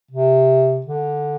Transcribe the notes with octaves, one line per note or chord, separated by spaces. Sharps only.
C3
D3